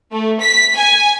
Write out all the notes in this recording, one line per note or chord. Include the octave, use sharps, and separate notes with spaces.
A3
B6
G#5